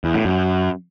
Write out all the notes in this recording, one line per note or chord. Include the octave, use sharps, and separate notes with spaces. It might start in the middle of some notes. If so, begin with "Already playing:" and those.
E2
A2
F#2